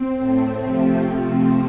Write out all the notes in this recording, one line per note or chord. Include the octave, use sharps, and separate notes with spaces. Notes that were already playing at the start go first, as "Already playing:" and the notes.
Already playing: C4
A2 A3
C3 F3 A3
C3 F3 A3